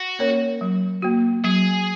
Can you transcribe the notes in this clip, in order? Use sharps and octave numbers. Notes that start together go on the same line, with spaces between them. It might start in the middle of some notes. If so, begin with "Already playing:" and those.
Already playing: F#4
A#3 C#4 A#4 C#5
F#3
A#3 F#4
F#3 G#4